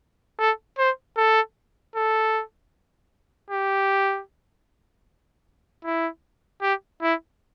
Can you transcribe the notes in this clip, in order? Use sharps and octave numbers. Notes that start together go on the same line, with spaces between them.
A4
C5
A4
A4
G4
E4
G4
E4